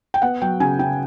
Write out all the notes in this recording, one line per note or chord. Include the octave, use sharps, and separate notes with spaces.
G5
B3 F#5
F#3 G5
C#3 G#5
C#3 G5